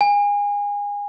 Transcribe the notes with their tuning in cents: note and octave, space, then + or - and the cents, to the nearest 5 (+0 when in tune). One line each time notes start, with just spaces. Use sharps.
G#5 -30